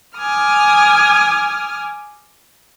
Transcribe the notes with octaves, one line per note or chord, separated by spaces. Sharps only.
G#5 D6 D#6 F6